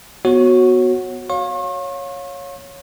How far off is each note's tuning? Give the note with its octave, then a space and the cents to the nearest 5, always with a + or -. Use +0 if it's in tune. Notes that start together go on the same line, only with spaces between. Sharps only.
B3 +0 F#4 -5 C#5 -30
C#5 +0 F5 +25 C#6 -45